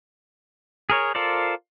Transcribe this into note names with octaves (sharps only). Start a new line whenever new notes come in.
G#4 A#4 C#5
F4 A4 A#4 C5 D5